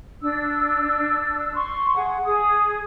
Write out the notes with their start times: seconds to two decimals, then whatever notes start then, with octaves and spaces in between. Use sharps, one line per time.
0.21 D4 E6
1.53 C6 C#6
1.95 G#4 F#5
2.25 G#4 D#6